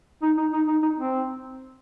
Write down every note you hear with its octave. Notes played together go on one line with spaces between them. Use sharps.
D#4
D#4
D#4
D#4
D#4
C4